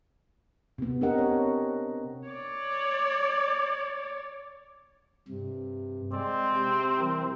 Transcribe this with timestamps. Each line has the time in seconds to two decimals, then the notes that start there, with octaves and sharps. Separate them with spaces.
0.78 C3 B3
1.01 C4 D4 G4 A#4 D#5 F#5
1.18 C#5
2.28 C#5 D5
5.28 G2 C3
6.12 G#3 C4 D5
6.53 C3 G5
6.98 E3 G3 A#4